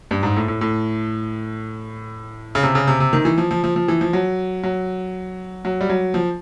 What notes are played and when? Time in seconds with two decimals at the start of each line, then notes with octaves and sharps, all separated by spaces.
0.11 G2
0.23 G#2
0.36 A2
0.48 A2
0.61 A2
2.55 C#3
2.63 C3
2.75 C#3
2.87 C3
3.00 C3
3.13 D#3
3.25 E3
3.38 F3
3.51 F3
3.64 F3
3.76 F3
3.88 E3
4.01 F3
4.13 F#3
4.64 F#3
5.65 F#3
5.81 G3
5.90 F#3
6.14 F3